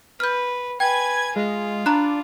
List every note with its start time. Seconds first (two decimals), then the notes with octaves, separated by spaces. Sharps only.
0.20 B4 F6 G6
0.80 B4 G5 G#5 G#6
1.36 G#3 F4
1.86 D4 A#5 B5 F#6